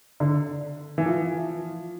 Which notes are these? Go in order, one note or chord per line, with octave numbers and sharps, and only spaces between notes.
D3
E3
F3